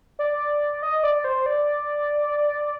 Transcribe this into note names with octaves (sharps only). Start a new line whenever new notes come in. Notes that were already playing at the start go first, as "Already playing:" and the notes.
D5
D#5
D5
C5
D5